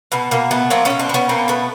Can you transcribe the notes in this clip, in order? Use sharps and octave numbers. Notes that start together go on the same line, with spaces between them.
B2 B3
B2 A#3
A3 B3
F#3 A#3 C4
B2 B3 C#4
C4 D4
B2
B3 C#4
B2 A#3 C4
A3 B3